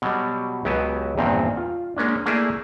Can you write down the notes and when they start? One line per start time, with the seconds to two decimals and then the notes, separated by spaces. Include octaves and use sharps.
0.02 B2 F#3 G3
0.65 C#2 F#3 B3 G4 G#5 A5
1.18 E2 G2 A#2 D#3 C4
1.57 F4
1.97 G#3 A#3 C#4 D4
2.26 A3 A#3 E4 G#4 D5 A5